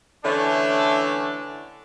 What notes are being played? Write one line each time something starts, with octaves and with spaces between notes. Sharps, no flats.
D3 E3 A3 C#4 D4